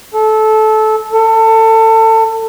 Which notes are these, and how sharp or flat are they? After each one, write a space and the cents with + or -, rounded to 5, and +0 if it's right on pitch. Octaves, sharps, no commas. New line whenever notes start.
A4 -20
A4 +25